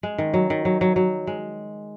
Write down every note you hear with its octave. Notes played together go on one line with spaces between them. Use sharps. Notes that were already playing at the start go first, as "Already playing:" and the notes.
G#3
D#3
F#3
D#3
F#3
F#3
F#3
G#3